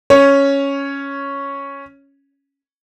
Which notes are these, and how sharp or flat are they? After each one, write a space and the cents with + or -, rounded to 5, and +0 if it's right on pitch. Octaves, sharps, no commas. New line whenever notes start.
C#4 +0 C#5 +0